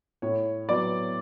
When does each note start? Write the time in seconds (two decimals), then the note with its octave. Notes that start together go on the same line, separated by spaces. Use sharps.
0.22 A2 C#5
0.68 F#3 B3 D5